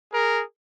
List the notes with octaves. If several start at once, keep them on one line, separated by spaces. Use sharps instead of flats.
G#4 A#4